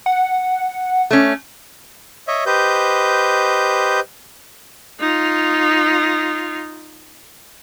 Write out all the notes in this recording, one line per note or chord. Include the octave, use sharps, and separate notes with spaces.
F#5
A3 C#4
C#5 D#5 E5
G4 B4 C5 D#5 G6
D#4 F4